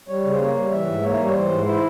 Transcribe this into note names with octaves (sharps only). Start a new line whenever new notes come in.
G3 C#5
C#3
C5
A#3 C#5
G3
E3 E5
G#2
A#3 C#5
G3
C#5
E3 C5
G#2
E4 C5